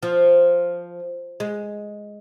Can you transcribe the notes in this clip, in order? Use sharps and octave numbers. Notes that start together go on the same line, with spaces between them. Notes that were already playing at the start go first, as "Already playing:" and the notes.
F3
G#3